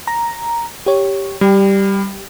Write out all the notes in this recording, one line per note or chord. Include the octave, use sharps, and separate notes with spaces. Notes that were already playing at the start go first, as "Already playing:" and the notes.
A#5
G4 C#5
G3 G4